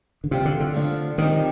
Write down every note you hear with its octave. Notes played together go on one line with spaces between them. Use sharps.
D3
C3 G3 C4 F4
D3
D3
F3 A3 D4 F4
C3 D#3 F3 C4 D#4 G4